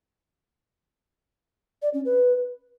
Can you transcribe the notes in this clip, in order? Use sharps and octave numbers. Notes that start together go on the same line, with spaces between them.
D5
C#4
B4